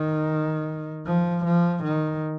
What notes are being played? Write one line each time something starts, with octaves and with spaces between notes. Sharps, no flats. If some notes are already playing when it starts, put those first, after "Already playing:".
Already playing: D#3
F3
F3
D#3